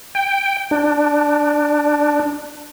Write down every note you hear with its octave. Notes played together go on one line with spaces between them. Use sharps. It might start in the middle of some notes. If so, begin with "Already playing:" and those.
G5
D4